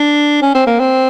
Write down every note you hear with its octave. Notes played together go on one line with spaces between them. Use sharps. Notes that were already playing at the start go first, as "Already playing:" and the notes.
Already playing: D4
C#4
C4
A#3
C4